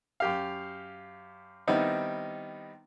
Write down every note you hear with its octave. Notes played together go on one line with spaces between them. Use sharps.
F#2 G4 F5
D#3 G3 B3 C4 D#4 E4